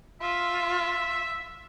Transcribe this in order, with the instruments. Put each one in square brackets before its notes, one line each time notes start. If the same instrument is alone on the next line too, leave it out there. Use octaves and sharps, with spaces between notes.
[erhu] F4 [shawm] E5